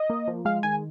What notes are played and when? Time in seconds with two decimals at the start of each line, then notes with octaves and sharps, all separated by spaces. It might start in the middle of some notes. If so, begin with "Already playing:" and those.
Already playing: D#5
0.10 A#3
0.28 F3
0.45 G#3 F5
0.63 D#3 G#5